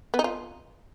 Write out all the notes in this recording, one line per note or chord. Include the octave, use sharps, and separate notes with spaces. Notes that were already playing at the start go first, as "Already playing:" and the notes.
B3
D#4
F4